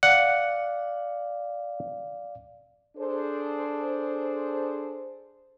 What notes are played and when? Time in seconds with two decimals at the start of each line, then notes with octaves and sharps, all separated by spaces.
0.03 D5 F5 F#5
2.97 D4 G#4 A4 C5